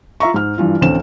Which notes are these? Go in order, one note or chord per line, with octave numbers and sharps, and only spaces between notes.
F4 E5 A#5 C#6
G#2 F6
G2 E3 F4
A1 D2 C4 E7